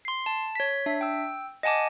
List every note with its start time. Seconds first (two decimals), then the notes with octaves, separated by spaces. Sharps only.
0.05 C6 C7
0.26 A5
0.55 C#5 B6
0.86 D4 E5
1.01 G5 E6
1.63 D#5 F#5 G#5 A5 D6